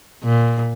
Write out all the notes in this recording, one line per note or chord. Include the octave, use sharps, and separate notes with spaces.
A#2